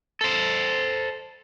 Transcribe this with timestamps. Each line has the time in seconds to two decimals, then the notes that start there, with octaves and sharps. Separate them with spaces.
0.21 A4 C5